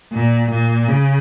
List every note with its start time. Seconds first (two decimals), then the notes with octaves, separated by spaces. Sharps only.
0.13 A#2
0.50 A#2
0.88 C#3